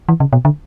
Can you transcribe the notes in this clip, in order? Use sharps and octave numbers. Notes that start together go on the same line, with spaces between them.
E3
C#3
B2
D3